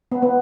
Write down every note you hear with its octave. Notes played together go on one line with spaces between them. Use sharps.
B3
B3